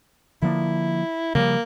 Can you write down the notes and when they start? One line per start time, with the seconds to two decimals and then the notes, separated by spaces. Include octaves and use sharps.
0.42 D3 F3 A#3 E4
1.35 C#3 F3 G3 A#3